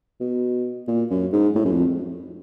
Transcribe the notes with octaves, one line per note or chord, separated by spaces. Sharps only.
B2
A#2
F#2
G#2
A2
F#2
F2